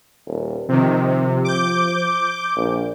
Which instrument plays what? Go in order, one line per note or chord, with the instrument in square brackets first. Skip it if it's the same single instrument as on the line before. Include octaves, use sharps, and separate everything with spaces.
[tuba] D#1
[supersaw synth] C3 D#3 [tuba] F3
[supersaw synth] C3
D6 G6
[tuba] A#1